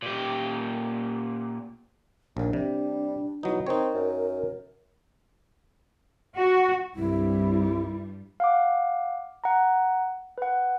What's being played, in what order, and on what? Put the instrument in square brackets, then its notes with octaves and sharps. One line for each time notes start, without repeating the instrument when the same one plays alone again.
[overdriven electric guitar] A#2 G4
[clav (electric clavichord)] A#1 A#2 [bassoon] D#2 [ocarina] D4
[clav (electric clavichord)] C3 [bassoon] G3
[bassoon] B2 [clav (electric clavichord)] F#3 D#4 [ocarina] E4
[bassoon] C4 [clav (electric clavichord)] D#4 C#5 [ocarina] A#4
[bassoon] F#2
[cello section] F#4
[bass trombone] C2 [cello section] G2 G3 [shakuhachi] E4
[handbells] F5 F#5 D6
F#5 A#5
B4 F#5